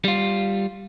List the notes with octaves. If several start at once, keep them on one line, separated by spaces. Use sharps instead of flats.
G3 F4